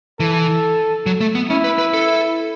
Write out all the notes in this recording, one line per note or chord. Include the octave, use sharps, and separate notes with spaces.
E3 A4
F#3
A3
B3
C#4 E4
B4
B4
A4